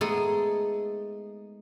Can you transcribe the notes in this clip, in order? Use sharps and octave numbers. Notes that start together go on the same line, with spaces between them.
G#3 A3 B3 D#4 G#4 A4